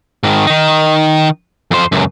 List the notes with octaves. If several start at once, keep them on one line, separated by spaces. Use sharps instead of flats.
G#2 D#3
D#3 D#4
F2 C5
C#2 F#2